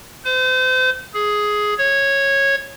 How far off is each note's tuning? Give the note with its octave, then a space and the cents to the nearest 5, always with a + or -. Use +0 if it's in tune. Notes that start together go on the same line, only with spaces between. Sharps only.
C5 -35
G#4 +10
C#5 -10